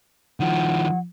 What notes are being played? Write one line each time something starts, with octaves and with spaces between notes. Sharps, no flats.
D#3 F3 F#5